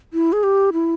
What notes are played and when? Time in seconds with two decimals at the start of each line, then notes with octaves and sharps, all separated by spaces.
0.13 E4
0.33 G#4
0.43 G4
0.73 E4